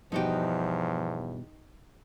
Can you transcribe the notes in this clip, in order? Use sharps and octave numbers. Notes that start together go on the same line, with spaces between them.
E2 G2 B2 F3 D#4 F#4 G4